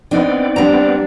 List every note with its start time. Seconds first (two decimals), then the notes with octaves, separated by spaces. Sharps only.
0.11 B3 C4 D4 D#4 D5
0.56 G3 D4 A#5